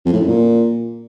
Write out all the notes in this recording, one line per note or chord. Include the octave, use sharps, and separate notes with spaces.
F2
A2
F#2
A#2